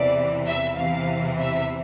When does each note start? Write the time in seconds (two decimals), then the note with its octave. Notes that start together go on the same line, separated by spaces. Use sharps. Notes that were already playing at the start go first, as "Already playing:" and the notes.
Already playing: E2 C3 E3 D5
0.46 E5
0.76 E2 C3 E3 F5
1.40 E5